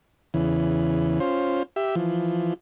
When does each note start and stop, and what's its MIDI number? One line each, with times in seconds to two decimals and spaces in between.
0.34 1.19 40
0.34 1.19 49
0.34 1.19 52
1.20 1.63 61
1.20 1.63 65
1.20 1.63 72
1.76 1.95 67
1.76 1.95 76
1.95 2.54 52
1.95 2.54 53